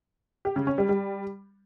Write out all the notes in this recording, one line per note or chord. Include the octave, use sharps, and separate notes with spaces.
G4
C#3
C#4
G3
G3